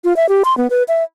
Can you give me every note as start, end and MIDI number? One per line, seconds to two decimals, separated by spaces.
0.04 0.16 65
0.16 0.28 76
0.29 0.43 67
0.45 0.56 84
0.57 0.67 59
0.70 0.83 71
0.88 1.03 76